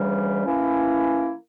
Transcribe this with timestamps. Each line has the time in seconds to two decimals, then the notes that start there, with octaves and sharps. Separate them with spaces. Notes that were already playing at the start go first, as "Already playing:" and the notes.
Already playing: D2 C#3 E3 G3
0.45 E3 A#3 C#4 E4